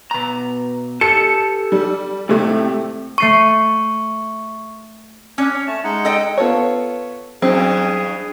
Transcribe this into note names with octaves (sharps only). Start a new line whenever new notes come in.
B2 A#5
G4 A4 A5 C#7
G3
A2 C3 A3 C4
A3 C#6 C7 D#7
C#4 D4
C#5
A3 A5
G#3 D#4 F#5
A4 D#5 G5
B3 F4 A4 C#5
G2 B2 E3 F#3 C4 C#4 G#4